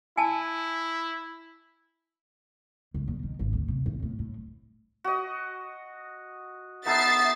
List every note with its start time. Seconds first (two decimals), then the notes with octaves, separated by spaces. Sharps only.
0.17 E4 G#5 A5
2.94 C#2
3.08 A#2
3.23 D#3
3.39 G#1
3.53 D2
3.68 C3
3.86 G#1
4.03 A2
4.19 A2
5.04 F#4 D#5
6.86 B3 D#4 A4 E5 A6 C7